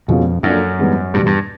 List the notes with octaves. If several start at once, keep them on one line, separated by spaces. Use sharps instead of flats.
F2 B2 G#3 C#4 F4
F#2 F3 A#3 D4 F#4 A4
G#2 E3 G3 B3
E2 G2 B2 G3
G2